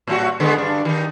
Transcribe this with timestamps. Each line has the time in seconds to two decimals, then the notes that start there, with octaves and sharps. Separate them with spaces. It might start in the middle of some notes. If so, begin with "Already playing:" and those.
0.07 A2 G3 F#4
0.40 D3 G#3 B3
0.56 G2 D4
0.85 D#3 D#4